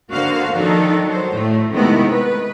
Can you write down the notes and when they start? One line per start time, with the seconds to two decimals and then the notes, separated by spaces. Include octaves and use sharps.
0.12 D3 A#3 F#4 C5 F5
0.56 D#3 F3 D4 D#4 A4
1.05 F#3 C5
1.35 A2 A3
1.73 C3 D#3 G#3 A3 B3 E4
2.09 B4